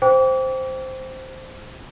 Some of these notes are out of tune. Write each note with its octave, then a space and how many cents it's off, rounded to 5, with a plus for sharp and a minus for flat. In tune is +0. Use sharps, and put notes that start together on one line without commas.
C5 +0 G5 +0 D6 -40